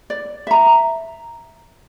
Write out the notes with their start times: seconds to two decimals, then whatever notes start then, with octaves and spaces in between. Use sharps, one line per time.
0.10 D5
0.47 E5 A#5